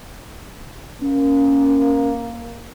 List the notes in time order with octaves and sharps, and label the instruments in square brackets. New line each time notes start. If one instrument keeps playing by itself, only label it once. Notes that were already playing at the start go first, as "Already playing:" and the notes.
[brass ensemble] A#3 [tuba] C#4